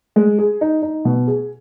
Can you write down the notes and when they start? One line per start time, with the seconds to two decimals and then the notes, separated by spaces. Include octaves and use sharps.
0.16 G#3
0.39 G#4
0.61 D#4
0.82 D#4
1.05 B2
1.28 G#4